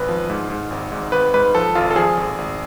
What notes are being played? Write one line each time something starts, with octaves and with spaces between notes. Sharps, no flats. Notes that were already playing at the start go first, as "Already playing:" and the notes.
Already playing: G#1 B4
F3
G#2
G#2
G#1
G#2
G#1 B4
G#2 B4
F3 A4
G#1 F4
A4
F3 G#4
G#1
G#1